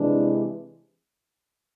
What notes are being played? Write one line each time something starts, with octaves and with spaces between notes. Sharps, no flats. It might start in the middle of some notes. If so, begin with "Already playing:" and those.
Already playing: C3 E3 G#3 D4